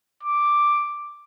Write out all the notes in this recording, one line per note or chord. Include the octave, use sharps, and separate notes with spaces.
D6